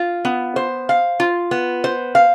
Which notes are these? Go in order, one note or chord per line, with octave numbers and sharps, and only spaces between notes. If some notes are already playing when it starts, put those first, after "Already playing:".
Already playing: F4
B3
C5
F5
F4
B3
C5
F5